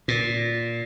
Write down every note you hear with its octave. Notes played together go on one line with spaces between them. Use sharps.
A#2